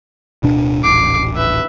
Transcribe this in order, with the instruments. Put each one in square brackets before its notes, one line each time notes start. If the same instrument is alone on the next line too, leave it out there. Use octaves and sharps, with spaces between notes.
[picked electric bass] D1 B2 D4
[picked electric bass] D#1 A1 [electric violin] D6 C7
[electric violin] B4 E5